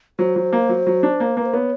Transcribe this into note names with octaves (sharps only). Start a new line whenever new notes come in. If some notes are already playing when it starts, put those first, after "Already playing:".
F#3 C5
F#3
A#3
F#3
F#3
D4
A#3
A#3 B4
C5
B3 C#5